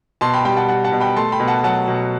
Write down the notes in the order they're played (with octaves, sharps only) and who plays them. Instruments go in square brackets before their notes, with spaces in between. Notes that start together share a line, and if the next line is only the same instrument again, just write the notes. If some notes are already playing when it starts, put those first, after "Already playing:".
[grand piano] B2 A5 C6
G5 B5
G3 G5 B5
F#5 A5
G3 F#5 A5
F#5 A5
B2
G5 B5
A3 A5 C6
G5 B5
B2
F#5 A5
F#3 F#5 A5
B2